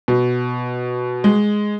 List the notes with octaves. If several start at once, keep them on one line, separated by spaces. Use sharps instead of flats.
B2
G#3